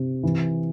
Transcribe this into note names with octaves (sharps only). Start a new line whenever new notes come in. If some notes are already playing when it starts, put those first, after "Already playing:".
Already playing: C3
E3